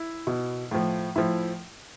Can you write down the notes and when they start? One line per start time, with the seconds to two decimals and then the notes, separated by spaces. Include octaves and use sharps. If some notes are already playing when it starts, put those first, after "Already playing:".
Already playing: E4
0.27 B2
0.71 A2 F3
1.16 A2 F3 E4